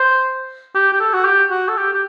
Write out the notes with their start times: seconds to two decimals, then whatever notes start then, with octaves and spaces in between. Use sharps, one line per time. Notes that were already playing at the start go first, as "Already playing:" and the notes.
Already playing: C5
0.75 G4
0.93 G4
1.00 A4
1.13 F#4
1.25 G4
1.51 F#4
1.68 A4
1.77 G4
1.93 G4